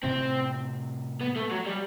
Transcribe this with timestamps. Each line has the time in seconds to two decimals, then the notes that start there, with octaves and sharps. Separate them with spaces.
0.04 A2 C3 C4
1.21 B3
1.36 A3
1.51 F#3
1.66 G3